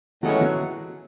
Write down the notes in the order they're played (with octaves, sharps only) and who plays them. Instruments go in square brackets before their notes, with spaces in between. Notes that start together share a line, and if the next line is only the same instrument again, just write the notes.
[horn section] A2 E3 G#3 C#4 F#4 [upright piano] F#3
[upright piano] F#3